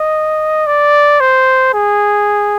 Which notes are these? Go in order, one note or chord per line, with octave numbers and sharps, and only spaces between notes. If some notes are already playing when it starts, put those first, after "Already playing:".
Already playing: D#5
D5
C5
G#4